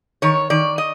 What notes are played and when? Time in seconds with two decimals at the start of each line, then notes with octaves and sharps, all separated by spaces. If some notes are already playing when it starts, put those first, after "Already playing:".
0.22 D#3 C#5
0.50 D#3 D5
0.78 D#5